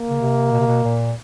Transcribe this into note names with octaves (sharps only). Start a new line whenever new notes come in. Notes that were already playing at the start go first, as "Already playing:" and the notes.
Already playing: A#3
C#3
C3
B2
C3
B2
A#2